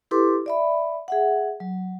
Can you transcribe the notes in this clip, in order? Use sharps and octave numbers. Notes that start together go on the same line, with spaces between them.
E4 G4 A4 B4 C6 D6
D5 E5 B5
G#4 E5 F#5
F#3